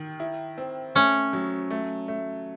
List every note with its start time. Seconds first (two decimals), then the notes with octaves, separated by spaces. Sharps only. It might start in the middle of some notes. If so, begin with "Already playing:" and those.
Already playing: D#3
0.20 E4
0.58 C4
0.95 A3 C#4
1.33 F#3
1.71 A3
2.08 A3